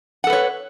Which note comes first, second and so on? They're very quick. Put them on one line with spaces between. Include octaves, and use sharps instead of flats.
F#5 A4 B4 C#5